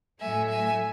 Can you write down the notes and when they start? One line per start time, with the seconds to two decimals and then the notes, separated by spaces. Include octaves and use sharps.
0.20 A2 F#3 A3 E5 G#5
0.49 E5 G#5